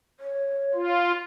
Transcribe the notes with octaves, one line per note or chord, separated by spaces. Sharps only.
C#5
F4